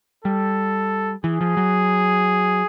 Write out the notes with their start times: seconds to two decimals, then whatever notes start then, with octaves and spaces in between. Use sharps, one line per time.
0.24 G3 A4
1.24 E3 G#4
1.41 F3
1.57 F#3